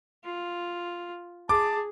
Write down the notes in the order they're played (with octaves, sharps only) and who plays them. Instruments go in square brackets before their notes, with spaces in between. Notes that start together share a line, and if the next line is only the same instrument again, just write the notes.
[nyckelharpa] F4
[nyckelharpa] G#4 [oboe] A5 [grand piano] D6